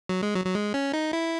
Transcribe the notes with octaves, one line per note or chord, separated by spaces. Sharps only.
F#3
G#3
F#3
F#3
G#3
C#4
D#4
E4